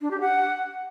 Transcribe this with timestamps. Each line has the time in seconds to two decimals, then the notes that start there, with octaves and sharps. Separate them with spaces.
0.01 D4
0.11 G4
0.21 F#5